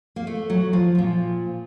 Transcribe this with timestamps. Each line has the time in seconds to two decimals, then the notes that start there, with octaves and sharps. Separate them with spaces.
0.16 A#3
0.27 A3
0.50 F#3
0.73 F3
0.95 A#2 F3